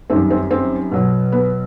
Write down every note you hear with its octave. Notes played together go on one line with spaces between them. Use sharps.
F#2 D#3 G3 C4
C4
C4
B2 F#3
B3